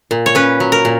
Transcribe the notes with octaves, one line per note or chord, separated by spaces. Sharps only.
A#2
C#5
C#4 B4
F#3
A#4
A#2